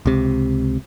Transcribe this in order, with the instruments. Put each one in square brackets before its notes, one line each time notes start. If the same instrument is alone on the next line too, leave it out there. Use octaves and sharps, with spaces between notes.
[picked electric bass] C#2 C3